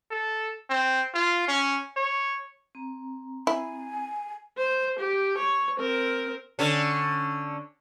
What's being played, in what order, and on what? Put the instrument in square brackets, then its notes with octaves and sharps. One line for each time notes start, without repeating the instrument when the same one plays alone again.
[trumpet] A4
C4
F4
C#4
C#5
[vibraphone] C4 A#5
[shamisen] E4 [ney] G#5
[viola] C5
G4
C#5
C4 A#4
[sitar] D3 C#4